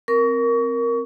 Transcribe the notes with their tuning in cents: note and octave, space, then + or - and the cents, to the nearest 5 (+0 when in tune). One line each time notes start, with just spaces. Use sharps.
C4 +0 A#4 +0 C#6 +30